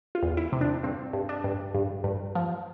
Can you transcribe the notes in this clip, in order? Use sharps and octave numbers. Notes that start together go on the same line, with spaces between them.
F4
E2
E4
C3
D4
G2 C4
G2
D4
G2
G2
G2
F3